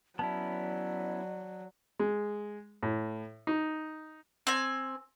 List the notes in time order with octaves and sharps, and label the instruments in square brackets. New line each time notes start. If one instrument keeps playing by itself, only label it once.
[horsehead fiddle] F#3 [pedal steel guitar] B3 C#4 E4 [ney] D5 [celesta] A5
[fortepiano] G#3
A2
D#4
[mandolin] C4 G#5